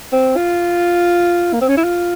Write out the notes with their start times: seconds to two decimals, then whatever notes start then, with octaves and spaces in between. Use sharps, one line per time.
0.12 C4
0.36 F4
1.53 A#3
1.61 C4
1.69 C#4
1.77 E4
1.84 F4